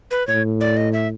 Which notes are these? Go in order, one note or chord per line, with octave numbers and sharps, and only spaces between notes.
B4
A2 C#5
D5
D#5
E5